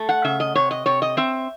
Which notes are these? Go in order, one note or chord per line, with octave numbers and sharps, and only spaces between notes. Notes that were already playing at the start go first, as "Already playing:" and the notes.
Already playing: A3
F#5
C#3 E5
D#5
C3 C#5
D#5
C3 C#5
D#5
C4 E5